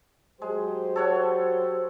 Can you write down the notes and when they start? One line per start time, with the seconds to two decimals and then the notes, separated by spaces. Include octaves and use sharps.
0.42 F#3 G#3 G4 C5
0.96 A4 C#5 F#5